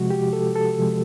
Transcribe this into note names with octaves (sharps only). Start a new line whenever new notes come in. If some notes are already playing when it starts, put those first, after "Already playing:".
Already playing: C3 F3 G#3 F#4
G4
A4
A4
C3 F3 G#3